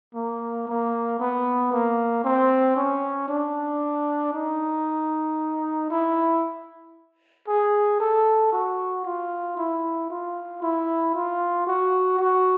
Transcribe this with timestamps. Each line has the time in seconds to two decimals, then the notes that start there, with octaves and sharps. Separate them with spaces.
0.15 A#3
0.67 A#3
1.19 B3
1.72 A#3
2.24 C4
2.76 C#4
3.29 D4
4.34 D#4
5.91 E4
7.48 G#4
8.00 A4
8.53 F#4
9.05 F4
9.57 E4
10.10 F4
10.62 E4
11.14 F4
11.67 F#4
12.19 F#4